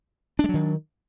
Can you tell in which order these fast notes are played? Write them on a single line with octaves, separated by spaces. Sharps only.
D4 G#3 F#3 D#3